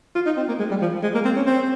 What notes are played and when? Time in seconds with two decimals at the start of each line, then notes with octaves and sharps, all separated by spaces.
0.15 F4
0.26 D#4
0.37 C4
0.48 A#3
0.59 G#3
0.70 G3
0.81 F3
1.03 G#3
1.14 A#3
1.25 C4
1.36 C#4
1.46 C4